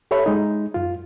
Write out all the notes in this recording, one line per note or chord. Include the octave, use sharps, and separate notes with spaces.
G4 A4 C#5 E5 B5
G#3 D#4
F#2 F4